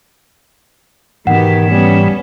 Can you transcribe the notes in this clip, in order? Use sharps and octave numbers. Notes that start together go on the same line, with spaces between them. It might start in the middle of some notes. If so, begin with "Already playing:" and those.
G#2 B2 D#3 E3 B3 G4 F#5
G3 B3 C#4